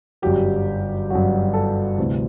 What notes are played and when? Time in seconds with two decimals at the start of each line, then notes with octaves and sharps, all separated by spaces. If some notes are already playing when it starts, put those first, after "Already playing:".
0.22 G1 F#2 F#3 G4
1.10 G1 F#2 F#3 F#4
1.54 A4
1.98 D2 C3 E3 A3 C4